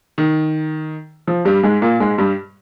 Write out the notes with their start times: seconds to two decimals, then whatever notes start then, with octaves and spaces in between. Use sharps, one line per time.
0.18 D#3
1.27 F3
1.45 G2 G3
1.63 G#2 G#3
1.82 A#2 A#3
2.00 G#2 G#3
2.18 G2 G3